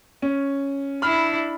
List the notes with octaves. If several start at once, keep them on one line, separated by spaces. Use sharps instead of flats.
C#4
D4 E4 B5 F6